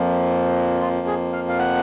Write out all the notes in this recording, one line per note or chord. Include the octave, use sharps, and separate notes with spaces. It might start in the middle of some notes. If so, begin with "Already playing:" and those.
Already playing: F2 F3 A#3
F4
G#4
F5
F5
F#5